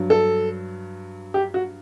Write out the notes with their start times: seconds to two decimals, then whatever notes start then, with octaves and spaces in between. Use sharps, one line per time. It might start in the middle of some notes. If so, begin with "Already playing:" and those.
Already playing: G2 F#3
0.10 A4
1.34 G4
1.54 F#4